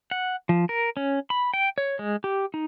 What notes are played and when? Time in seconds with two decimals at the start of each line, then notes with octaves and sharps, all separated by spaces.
0.11 F#5
0.49 F3
0.69 A#4
0.97 C#4
1.30 B5
1.54 G5
1.78 C#5
1.99 G#3
2.24 G4
2.54 D#4